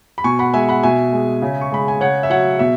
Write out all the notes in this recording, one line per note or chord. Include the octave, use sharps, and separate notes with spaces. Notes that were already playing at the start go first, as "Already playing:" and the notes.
B5
B2 G#5 C#6
F#5 B5
G#3 E5 G#5
F#5 B5
B2 E5 G#5
G#3
C#3
C#6
G#3 B5
G#5
C#3 C#5 F#5
E5
F#3 C#5 F#5
B2 E5